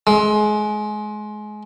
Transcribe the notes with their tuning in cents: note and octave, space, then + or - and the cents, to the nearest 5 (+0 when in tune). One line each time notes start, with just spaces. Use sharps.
G#3 +25